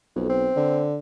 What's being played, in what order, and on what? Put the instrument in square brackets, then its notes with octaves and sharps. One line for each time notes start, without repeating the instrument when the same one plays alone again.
[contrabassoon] B1 [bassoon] F2
[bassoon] C4
[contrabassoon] D3